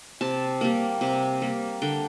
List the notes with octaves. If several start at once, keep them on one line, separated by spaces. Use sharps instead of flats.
C3 A5
G3 A#3
C3
G3 A#3
D3 G5